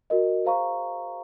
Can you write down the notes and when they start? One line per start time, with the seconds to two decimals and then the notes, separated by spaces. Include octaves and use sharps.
0.10 F#4 A#4 D#5
0.45 G#4 C5 F5 A#5 C#6